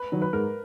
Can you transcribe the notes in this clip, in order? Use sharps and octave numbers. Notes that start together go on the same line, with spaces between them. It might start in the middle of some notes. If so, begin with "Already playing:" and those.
Already playing: B4
D#3 F#3
B4
G#2 A#4